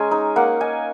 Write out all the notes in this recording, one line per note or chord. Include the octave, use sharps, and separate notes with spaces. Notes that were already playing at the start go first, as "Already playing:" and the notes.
Already playing: G#3 C#4 G#5 A#5
D#4
A#3 F#5
D#4 G#5